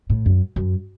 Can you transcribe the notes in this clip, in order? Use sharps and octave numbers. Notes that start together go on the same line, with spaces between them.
A2
F#2
F#2